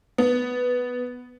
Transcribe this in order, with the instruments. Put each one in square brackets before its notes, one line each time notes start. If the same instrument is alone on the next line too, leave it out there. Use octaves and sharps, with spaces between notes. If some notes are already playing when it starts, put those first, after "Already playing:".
[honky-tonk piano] B3